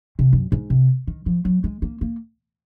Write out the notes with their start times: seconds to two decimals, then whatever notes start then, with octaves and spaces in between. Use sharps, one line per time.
0.19 C3
0.33 F#2
0.52 G#2
0.70 C3
1.07 D#3
1.26 F3
1.45 F#3
1.64 G#3
1.82 A#3
2.01 A#3